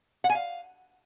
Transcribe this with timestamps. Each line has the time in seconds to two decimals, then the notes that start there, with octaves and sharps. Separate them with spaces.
0.24 F#5
0.30 G#5
0.35 F5